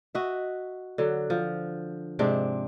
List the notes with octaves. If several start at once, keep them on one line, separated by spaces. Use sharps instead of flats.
F#4 D#5 E5
D3 F#3
F3
G#2 C3 C4 D4